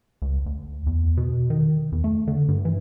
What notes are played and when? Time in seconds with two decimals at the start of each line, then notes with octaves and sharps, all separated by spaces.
0.22 C#2
0.46 D2
0.87 E2
1.17 B2
1.50 D#3
1.92 E2
2.04 A3
2.27 D3
2.48 G2
2.65 E3